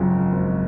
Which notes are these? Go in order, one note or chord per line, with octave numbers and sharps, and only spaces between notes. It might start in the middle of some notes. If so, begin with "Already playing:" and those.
Already playing: G#1 F#2 C#3 F3
G#1